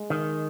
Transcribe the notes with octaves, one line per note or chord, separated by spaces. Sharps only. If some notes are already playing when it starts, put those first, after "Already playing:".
Already playing: G#3
D#3